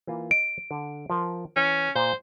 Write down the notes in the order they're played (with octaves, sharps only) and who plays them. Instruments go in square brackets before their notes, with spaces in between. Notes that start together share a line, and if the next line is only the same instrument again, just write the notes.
[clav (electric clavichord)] E3 A#3 F4
[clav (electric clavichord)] D#5 [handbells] D7
[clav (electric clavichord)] D3
F3 A#4
[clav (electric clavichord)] E3 [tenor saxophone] C#4
[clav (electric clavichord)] A#2 [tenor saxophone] C5